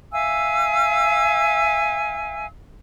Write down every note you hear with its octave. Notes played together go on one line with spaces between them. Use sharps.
E5 F5 G#5 E6